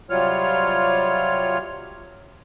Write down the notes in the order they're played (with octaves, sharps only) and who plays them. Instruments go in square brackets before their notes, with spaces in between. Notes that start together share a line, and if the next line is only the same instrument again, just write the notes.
[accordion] C3 F#3 G3 F4 C#5 F6